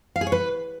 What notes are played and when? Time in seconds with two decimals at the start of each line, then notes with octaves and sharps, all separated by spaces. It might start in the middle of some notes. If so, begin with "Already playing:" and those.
0.16 F5
0.21 G#4
0.27 C#5
0.32 B4